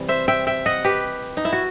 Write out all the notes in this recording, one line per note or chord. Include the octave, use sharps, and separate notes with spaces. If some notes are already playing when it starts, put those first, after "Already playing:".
Already playing: C3 E3 G3
C5 E5
E5 G5
E5 G5
D#5 F#5
G4 B4
D#4
E4
F#4